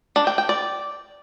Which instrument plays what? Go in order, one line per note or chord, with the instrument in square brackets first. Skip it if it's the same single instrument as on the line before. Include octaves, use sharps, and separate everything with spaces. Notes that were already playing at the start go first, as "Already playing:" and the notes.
[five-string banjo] D4
G5
G5
D5